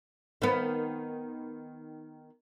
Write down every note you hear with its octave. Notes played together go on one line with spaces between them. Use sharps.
D#3 B3